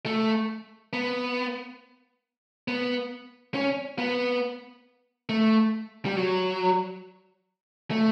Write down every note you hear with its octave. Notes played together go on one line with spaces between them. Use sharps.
A3
B3
B3
C#4
B3
A3
G3
F#3
A3